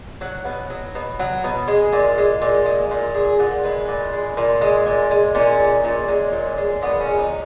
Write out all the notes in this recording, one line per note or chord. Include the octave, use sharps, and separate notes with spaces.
F#3 F#5
B2
F#3
B2
F#3
B2
G#3
A#2
G#3
A#2
G#3
A#2
G#3 G#4
A#2 F#5
G#3 B4
A#2
G#3
A#2
G#3
A#2
G#3
A#2 C#4
G#3
A#2
G#3
A#2
G#3
A#2 B3
C#4
G#3
D#4